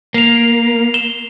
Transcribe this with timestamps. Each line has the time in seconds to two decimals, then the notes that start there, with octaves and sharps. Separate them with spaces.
0.14 A#3 C7 F7
0.94 E7 G7